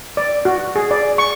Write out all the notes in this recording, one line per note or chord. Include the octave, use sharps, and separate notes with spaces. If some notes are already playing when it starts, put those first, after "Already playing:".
D5
F#4
G#4
D5
C#6